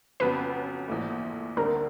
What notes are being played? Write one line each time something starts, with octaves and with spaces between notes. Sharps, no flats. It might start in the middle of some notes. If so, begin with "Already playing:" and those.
F2 C#3 F#3 B3 B4
A#1 G#2 E3 A3
D2 D3 G3 C4 D#4 A#4